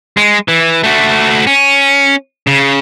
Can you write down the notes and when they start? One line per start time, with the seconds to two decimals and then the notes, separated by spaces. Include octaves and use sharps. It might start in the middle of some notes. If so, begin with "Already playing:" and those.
0.17 G#3
0.48 E3
0.83 A3 F#4
1.47 C#4
2.47 C#3